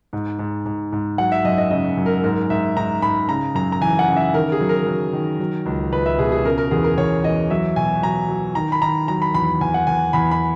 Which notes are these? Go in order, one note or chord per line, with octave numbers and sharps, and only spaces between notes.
G#2
G#2
G#2
G#2
F#3 F#5
E5
F#2 D#5
D#5
C#3 D#5
F#2
A#4
G#2 A#4
G#2 E5
G#2 A#5
G#2 B5
C#3 A#5
F#2 A#5
A#5
E3 G#5
F#5
C#3
E5
D#3 A#4
G#4
F#3
A#4
F#3
D#3
F#3
C#2
C#2 B4
E5
B2 G#4
G#4
C#3 A#4
A#4
E2 G#4
A#4
E2 C#5
E2 D#5
F#3 E5
B2 G#5
F#3 A#5
F#3
D#3 A#5
B5
D#3 A#5
F#3 A#5
B5
E2 B5
E2 G#5
F#5
E2 G#5
E2 B5
B5